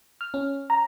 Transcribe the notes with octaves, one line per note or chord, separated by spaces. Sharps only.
F6
C#4
A#5